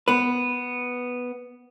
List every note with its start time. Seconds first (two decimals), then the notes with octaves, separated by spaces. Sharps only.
0.08 B3 B4